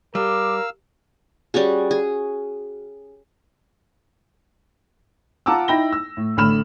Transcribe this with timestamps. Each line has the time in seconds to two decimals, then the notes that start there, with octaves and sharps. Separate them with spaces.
0.15 G3 A#4 F5 D6 E6
1.54 G3 C#4 F#4 G#4
1.91 G#4
5.46 F4 F#5 A5 A#5 D6 E6
5.68 D#4 E4 G5 B5 A#6 G7
5.93 E6
6.17 A2
6.37 A1 A2 D3 B5 F6 E7